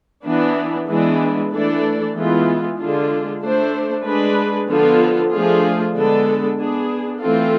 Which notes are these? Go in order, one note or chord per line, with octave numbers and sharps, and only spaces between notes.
E3 B3 D4
E3 G#3 B3 D4
E3 A3 D4 A4 D5
E3 G#3 B3 F4
D3 G#3 D4 F4
A3 D4 A4 C5
G#3 D4 G#4 B4
D3 F3 B3 F4 A4
F3 A3 D4 F4 G#4
D3 G#3 B3 D4 A4
B3 D4 G#4
E3 A3 C4 F4 A4